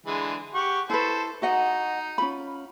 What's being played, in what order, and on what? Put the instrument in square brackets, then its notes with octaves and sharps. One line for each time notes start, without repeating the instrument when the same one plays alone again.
[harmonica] D3 E3 G#3
G4 F#5 C#6
[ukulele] E4 B4 [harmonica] A4 C5
[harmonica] D#4 [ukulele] F#4 D#5 F#5
[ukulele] C#4 F4 B5